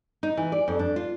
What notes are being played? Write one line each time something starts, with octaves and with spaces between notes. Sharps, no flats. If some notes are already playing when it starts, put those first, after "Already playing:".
D#4
E3
D5
F2
D4
F4